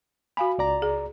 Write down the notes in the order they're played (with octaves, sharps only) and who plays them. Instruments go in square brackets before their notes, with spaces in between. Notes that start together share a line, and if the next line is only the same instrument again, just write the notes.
[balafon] F#4 F5 G#5 [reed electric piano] B5
[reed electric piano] C#2 D5 A#5
[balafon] G#4